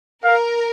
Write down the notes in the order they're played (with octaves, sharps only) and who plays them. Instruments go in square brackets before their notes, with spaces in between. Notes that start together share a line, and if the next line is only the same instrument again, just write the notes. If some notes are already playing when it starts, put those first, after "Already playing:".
[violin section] A#4 [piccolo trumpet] F5